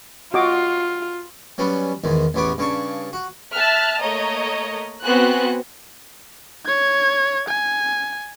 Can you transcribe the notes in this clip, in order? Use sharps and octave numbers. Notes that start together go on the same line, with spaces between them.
F4 F#4 D#5 D6
F#3 G3 B3 C#4
E2 G#2 D#3
A1 E2 B3 C#5 D6
G2 C#3 A5 C#6
F#4
E5 A5 F6 F#6
A3 A#3 C#5 D#5 A#5
B3 C4 F#4 C5 G#5 F#6
C#5 G#6
G#5